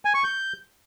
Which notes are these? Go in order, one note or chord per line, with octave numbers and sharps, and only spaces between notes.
G#5
C#6
G6